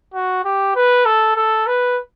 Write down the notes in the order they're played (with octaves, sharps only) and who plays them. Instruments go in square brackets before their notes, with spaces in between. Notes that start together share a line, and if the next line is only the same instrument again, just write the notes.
[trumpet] F#4
G4
B4
A4
A4
B4